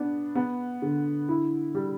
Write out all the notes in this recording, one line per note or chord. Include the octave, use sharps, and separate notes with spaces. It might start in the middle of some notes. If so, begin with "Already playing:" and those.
Already playing: B3 D4
B3
D3
E4
G3